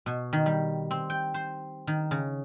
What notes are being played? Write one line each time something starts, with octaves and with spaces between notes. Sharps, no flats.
B2
D#3
G3
C4
G5
C5
D#3
C#3